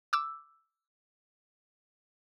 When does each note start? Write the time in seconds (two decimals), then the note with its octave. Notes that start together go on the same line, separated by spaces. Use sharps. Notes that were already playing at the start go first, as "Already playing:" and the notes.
0.13 D6 E6